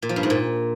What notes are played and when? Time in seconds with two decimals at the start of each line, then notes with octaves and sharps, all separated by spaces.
0.02 A#2
0.09 F3
0.16 G2
0.23 G#2
0.30 A#2